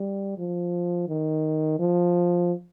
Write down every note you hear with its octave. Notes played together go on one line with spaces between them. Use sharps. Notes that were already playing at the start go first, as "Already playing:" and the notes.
Already playing: G3
F3
D#3
F3